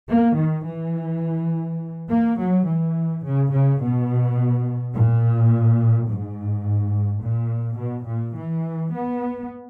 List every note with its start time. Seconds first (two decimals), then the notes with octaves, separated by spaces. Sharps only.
0.09 A#3
0.37 D#3
0.66 E3
2.08 A#3
2.37 F#3
2.66 E3
3.23 C#3
3.51 C#3
3.79 B2
4.94 A#2
6.08 G#2
7.22 A#2
7.78 B2
8.07 A#2
8.36 E3
8.93 B3